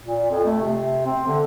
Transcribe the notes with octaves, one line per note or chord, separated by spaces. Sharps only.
A#2
F2
A3
C3
C4
D3